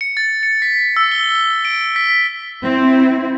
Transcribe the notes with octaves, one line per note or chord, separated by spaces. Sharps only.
C#7
A6
C#7
B6
E6
G7
D7
B6
C4 E4